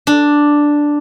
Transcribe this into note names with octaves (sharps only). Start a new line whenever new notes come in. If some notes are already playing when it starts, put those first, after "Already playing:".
D4